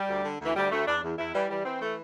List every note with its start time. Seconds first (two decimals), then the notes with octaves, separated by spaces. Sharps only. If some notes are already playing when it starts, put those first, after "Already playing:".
Already playing: G3
0.09 D2
0.24 D3
0.40 D2 E3
0.55 D2 G3
0.70 D2 A3
0.86 E2 D4
1.03 E2
1.17 E2 E4
1.33 E3 G3
1.49 E3 G3
1.64 E3 C4
1.80 E3 A3